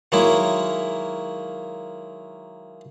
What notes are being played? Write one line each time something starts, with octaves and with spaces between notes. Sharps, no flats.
D#3 F#3 G#3 A#3 E4